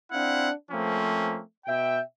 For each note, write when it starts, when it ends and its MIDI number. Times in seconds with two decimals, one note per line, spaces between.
0.11 0.50 60
0.11 0.50 62
0.11 0.50 64
0.11 0.50 77
0.11 0.50 78
0.70 1.40 53
0.70 1.40 57
0.70 1.40 58
0.70 1.40 60
0.70 1.40 61
1.66 2.00 47
1.66 2.00 76
1.66 2.00 79